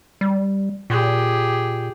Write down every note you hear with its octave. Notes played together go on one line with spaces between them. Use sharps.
G3
A#2 G4 G#4